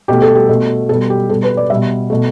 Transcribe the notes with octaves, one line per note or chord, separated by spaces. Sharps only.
B2 A3 G4
A4
G4
B2 A3
B2 G3 A4
G4
B2 G3 A4
B4
D5
B2 G3 E5
B2 A3